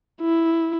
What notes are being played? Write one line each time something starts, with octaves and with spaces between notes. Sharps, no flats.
E4